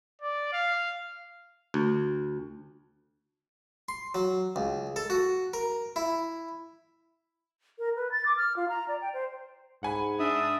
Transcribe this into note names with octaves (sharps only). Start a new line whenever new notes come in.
D5
F5
D2
C6
F#3
C#2
A4
F#4
A#4
E4
A#4
B4
A6
D6
F6
F4
A#5
D5
G5
C5
G#2 F#5 G#5 B5
D4 E5 D#6